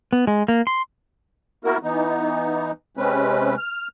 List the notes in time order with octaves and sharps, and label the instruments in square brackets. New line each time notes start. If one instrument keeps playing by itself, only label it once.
[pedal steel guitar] B3
G#3
A#3
C6
[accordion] A#3 B3 E4 F#4 A#4
E3 B3 D#4
C3 G#3 C4 C#4 B4
F6